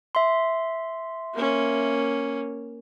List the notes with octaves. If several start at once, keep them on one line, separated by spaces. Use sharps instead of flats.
E5 C6
A#3 C#4